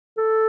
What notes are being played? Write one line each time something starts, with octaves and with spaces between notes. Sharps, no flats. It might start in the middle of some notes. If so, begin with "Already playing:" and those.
A4